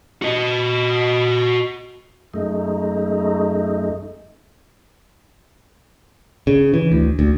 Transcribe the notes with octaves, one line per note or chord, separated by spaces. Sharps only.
F#4 D#5
F#2 G#3 A3 D#4
C#3
E3
D2
D2